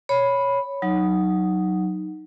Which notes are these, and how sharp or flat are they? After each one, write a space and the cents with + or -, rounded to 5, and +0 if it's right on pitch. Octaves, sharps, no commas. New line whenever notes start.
C#5 +0 B5 +0
F#3 +0 D#4 +0